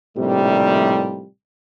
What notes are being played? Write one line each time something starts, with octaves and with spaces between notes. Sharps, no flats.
A#1 A2 C3 D#3 F3 G3